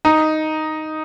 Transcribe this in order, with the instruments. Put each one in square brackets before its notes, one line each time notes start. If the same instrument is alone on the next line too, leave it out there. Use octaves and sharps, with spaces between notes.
[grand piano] D#4